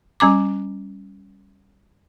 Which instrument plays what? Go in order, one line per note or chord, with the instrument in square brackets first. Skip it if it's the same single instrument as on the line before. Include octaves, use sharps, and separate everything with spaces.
[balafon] G3 C#4 A#5 D6